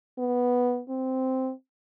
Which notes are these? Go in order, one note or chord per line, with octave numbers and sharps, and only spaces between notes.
B3
C4